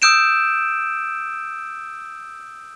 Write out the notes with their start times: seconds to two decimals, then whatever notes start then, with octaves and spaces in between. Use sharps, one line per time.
0.02 D#6 E6 G6 D7 E7